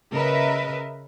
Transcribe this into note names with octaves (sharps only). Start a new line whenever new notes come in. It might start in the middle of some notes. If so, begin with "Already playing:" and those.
C#3 A#4 B4 D#5 E5